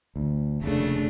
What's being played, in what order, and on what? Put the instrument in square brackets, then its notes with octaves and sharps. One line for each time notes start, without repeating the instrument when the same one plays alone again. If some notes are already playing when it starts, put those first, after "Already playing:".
[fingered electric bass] D2
[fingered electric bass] F1 D#2 [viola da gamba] C#3 A3 D4